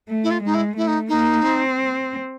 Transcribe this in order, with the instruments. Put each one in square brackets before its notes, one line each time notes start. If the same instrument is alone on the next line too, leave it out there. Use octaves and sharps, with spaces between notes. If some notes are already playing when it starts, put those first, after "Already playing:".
[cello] A3
[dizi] E4
F4
[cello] G#3 [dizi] D#4
[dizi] E4
[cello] A3 [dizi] E4
[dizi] D#4
[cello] A#3 [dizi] D#4
[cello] C4